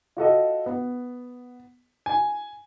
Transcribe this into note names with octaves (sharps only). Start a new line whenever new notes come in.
F4 F#4 A4 D#5
B3
G#5